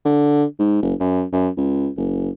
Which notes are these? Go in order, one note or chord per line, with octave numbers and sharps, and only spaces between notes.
D3
G#2
F#1
F#2
F#2
C#2
F#1